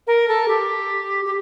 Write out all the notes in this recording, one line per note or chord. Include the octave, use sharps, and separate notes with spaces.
A#4
A4
G4
G4